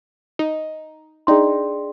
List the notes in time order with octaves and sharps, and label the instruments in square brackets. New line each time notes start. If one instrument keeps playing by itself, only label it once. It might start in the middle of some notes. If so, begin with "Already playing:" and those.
[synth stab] D#4
[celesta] D4 G#4 D5 G5 C6 [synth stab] D#4